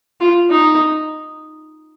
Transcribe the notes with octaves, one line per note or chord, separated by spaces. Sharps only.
F4
D#4